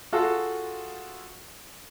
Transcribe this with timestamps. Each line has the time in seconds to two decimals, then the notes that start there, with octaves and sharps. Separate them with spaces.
0.13 F4 F#4 G#4 A4